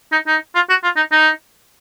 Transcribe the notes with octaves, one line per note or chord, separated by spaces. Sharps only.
D#4
D#4
F4
F#4
F4
D#4
D#4